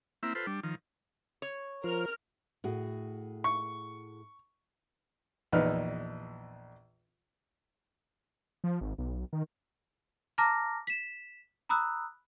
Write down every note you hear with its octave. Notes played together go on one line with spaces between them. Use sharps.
A#3 C4 E4 E5
F4 A4 B4 C5
G3 D4
D#3 F3
C#5
F3 F4 A#4 C5 F6
A2 F#4 G#4
C#6
A#1 E2 D#4 B4 F6
F3
G#1
B1
D#3
A5 A#5 D6 F6 A#6
B6 E7
A#5 B5 D#6 E6 F#6